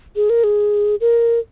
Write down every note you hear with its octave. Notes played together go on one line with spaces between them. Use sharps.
G#4
A#4
G#4
A#4